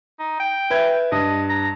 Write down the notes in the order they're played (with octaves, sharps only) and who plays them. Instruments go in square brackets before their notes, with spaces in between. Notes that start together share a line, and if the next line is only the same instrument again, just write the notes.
[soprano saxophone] D#4
G5
[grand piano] B4 E5 G#6
[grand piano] G2 [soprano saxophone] D#5
[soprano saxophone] A#5